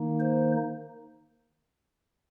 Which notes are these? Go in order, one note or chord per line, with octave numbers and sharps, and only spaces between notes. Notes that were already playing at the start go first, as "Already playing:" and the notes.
Already playing: D#3 A#3 D#4
C5